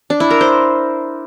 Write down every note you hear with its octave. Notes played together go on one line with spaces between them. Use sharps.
D4
E4
A#4
C5